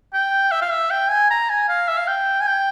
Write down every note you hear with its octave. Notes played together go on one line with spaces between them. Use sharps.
G5
E5
F5
E5
G5
G#5
A#5
G#5
F5
E5
F5
G5
G#5
G5